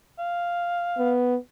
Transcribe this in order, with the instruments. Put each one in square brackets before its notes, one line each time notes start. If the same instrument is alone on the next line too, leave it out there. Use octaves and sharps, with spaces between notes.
[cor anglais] F5
[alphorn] B3